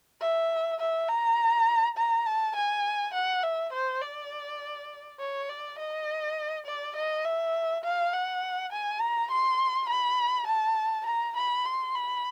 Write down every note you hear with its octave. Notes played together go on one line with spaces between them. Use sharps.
E5
E5
A#5
A#5
A5
G#5
F#5
E5
C5
D5
C#5
D5
D#5
D5
D#5
E5
F5
F#5
G#5
A#5
C6
B5
A5
A#5
B5
C6
B5